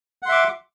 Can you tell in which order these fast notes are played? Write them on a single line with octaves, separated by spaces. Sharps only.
F#5 C6 E5 D6